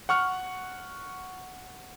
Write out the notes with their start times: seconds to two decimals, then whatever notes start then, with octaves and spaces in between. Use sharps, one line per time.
0.09 F#5 C#6 F6